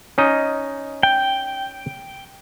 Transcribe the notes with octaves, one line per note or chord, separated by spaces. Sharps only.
C#4 D#4 D#5
G5